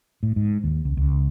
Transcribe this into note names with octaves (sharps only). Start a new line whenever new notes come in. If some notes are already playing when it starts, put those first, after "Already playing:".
A2
G#2
D#2
C#2
C#2